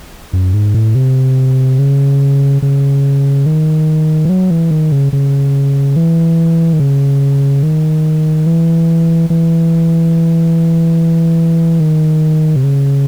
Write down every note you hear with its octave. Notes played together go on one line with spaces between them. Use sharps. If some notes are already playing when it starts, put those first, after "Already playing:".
F#2
G#2
A2
C3
C#3
C#3
D#3
E3
F#3
E3
D#3
C#3
C#3
E3
D#3
C#3
D#3
E3
E3
D#3
C3
C#3